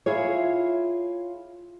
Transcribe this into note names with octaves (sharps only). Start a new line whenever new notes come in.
E4 F4 G#4 C#5